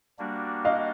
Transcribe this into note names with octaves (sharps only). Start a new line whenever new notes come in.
G3 A#3 D4 F#4
D#5 F5